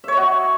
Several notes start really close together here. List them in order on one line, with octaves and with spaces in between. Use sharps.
E5 C#5 D#5 F#4